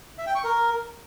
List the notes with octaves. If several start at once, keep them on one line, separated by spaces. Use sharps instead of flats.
E5
G5
C#6
A#4